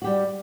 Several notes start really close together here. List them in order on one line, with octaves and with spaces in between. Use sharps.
F#4 G4 G3